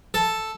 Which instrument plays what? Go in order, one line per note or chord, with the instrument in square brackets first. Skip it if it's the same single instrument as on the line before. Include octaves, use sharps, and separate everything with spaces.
[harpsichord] A4